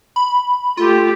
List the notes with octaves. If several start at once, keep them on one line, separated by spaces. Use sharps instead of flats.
B5
A3 F4 G4